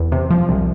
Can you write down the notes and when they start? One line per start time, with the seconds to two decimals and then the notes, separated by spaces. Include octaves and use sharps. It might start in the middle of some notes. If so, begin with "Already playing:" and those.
Already playing: E2
0.12 C3
0.31 F3
0.49 C2